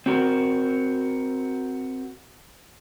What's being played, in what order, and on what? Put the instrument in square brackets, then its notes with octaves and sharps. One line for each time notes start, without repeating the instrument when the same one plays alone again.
[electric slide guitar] C4 F#4 A#4